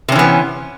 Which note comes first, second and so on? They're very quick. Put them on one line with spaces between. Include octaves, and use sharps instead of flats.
C3 C#4 E3 B3